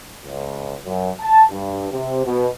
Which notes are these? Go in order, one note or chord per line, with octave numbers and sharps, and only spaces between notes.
C#2
F#2
A5
G2
C3
B2